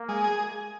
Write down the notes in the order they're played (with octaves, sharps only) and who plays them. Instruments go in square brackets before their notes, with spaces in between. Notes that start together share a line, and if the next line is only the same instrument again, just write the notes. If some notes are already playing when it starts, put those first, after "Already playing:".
Already playing: [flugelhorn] A#3
[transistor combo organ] G#3
G#4